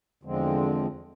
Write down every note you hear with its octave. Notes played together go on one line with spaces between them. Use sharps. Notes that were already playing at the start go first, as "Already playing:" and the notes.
E2 D3 F3 G#3 C4